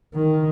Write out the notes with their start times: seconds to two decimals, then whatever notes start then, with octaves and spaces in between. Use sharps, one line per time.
0.15 D#3